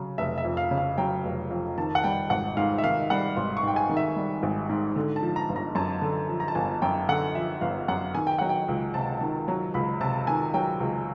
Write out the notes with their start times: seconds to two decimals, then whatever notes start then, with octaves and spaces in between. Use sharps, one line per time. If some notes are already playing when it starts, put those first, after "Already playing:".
Already playing: C#3 F#3
0.18 F1 E5
0.38 E5
0.45 F2
0.57 F5
0.71 C#3
0.78 F5
0.98 F#3 G5
1.24 F1
1.51 F2
1.78 D#3 A5
1.95 F#5
2.04 G3 G5
2.30 G#1 F#5
2.57 G#2 F5
2.78 E5
2.84 D#3 F5
3.10 G3 F#5
3.37 G#1 C6
3.57 C#6
3.63 G#2 G5
3.76 G#5
3.89 D#3
3.97 E5
4.16 G3
4.43 G#1
4.69 G#2
4.96 D3
5.16 A5
5.22 F3
5.36 A#5
5.49 G1
5.56 A#5
5.75 F#2 A5
6.02 D3
6.29 F3
6.40 A#5
6.48 A5
6.55 G1 G#5
6.82 F#2 G5
7.09 D3 F#5
7.35 F3 E5
7.61 G1 F5
7.88 F#2 F#5
8.15 D#3 G#5
8.27 G5
8.38 F#3 F#5
8.49 G5
8.68 C#2
8.94 C3 A5
9.21 D#3
9.48 F#3
9.74 C#2 B5
10.01 C3 A5
10.27 D#3 G#5
10.54 F#3 G5
10.80 C#2